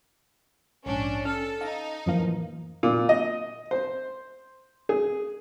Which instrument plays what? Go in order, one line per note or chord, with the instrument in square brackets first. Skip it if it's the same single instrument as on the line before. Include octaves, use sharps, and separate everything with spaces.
[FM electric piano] A#1 G#2 [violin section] C#4 D4
[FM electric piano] C#4 [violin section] A4 [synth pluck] F6
[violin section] D#4 [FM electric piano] F5
[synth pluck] F#2 F3 F5 [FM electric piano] A2 E3 A#3
[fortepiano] A#2
D#5
C5
G#4